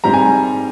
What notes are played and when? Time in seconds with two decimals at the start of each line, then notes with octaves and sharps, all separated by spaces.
0.04 G#2 G3 C4 A#5
0.14 G#5